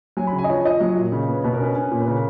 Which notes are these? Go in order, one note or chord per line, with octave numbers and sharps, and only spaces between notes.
F#3 G#5
B5
C#3
G#5
D#5
F3 C#5
F3 D#5
F#3 C#5
A#2
C#3
B3
B2 B4
A#4
C#4 B4
C#4
A#2
B4
C#3 A#4